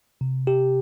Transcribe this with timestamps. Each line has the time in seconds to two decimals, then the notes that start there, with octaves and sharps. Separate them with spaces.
0.21 C3
0.47 G4